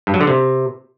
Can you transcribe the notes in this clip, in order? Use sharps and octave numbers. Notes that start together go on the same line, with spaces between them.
G2
F#3
D3
C3